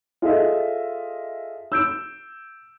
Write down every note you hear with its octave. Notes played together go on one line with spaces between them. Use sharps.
F4 G#4 A4 D#5 E5
E6 G6 D7 E7